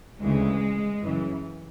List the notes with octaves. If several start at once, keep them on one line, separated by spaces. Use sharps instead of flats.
D2 C#3 E3 G#3
F#2 C#3 E3